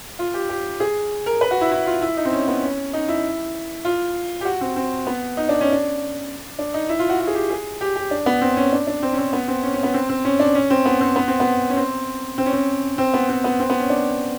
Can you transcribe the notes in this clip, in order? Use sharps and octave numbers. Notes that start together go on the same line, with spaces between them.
F4
G4
G4
G#4
A#4
B4
F#4
E4
E4
F4
E4
D#4
C4
C#4
B3
C#4
D#4
E4
F4
G4
F#4
C4
C4
B3
D#4
D4
C#4
D4
D4
D#4
E4
F4
F#4
F#4
G#4
G4
G#4
G4
G4
D4
B3
C4
C#4
D4
D4
C4
C#4
C4
B3
C4
C#4
C#4
B3
C4
C4
C#4
D4
C#4
C4
B3
C4
B3
C4
B3
C#4
C4
C4
C#4
C4
C4
B3
C4
B3
C4
B3
C#4
D4